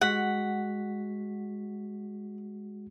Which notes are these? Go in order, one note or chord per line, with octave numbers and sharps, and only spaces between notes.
G#3 F#4 F#5 B6